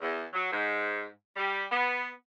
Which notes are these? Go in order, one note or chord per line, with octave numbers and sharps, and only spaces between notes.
E2
F#3
G#2
G3
B3